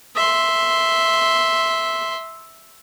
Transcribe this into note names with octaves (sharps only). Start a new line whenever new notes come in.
E5 C6